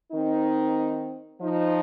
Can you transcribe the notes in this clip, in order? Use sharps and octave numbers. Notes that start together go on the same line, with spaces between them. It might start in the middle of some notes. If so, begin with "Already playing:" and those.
D#3 C4 D#4
F3 D#4